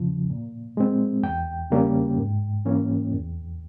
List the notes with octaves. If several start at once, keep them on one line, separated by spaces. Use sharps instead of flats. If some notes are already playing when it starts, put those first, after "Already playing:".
Already playing: E2 C#3 F3
A#2
G#3 C4
E2 G5
C#3 G3 A#3 C#4
G#2
E3 A#3 C#4
E2